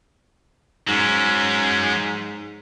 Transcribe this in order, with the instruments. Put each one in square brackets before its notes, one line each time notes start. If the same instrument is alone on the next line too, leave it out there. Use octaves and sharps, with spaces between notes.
[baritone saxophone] G#2 [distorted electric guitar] F#3 C#4